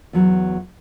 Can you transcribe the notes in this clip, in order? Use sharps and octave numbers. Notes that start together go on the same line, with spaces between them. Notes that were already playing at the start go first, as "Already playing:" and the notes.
E2 F#3